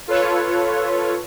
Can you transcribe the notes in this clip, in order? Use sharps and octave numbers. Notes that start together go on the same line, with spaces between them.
F4 A4 B4 C#5